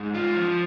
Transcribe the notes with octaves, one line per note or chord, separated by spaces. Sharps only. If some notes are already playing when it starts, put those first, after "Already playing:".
Already playing: G#2
F4
F3